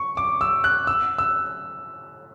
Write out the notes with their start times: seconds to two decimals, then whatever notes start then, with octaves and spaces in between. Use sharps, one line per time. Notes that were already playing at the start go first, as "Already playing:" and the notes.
Already playing: C#6
0.17 D6
0.41 E6
0.64 F#6
0.87 E6
1.18 E6